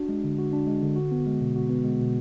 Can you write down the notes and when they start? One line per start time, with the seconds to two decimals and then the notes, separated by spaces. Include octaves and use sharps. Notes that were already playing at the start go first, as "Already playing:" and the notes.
Already playing: D4 F#4
0.09 G#3
0.24 D3
0.38 F#4
0.53 D4
0.67 G#3
0.83 D3
0.96 F#4
1.11 B3
1.27 G#3
1.41 B2
1.56 F#4
1.69 B3
1.85 G#3
1.99 B2